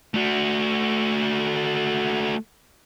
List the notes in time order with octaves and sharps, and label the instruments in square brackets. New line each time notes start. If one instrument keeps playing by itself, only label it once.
[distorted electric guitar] A3 F#4